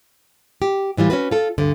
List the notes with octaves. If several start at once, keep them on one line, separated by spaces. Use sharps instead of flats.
G4
A2 E3 G3 F4
C#4 D4 F#4 B4
F4 A4
D2 G2 D3